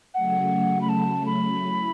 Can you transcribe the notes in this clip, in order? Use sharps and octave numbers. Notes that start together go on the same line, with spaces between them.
C#3 F#3 A3 F#5
B5
A5
B5
E4